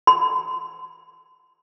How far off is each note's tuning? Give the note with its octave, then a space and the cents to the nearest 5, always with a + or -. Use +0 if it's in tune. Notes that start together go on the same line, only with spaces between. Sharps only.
C6 -40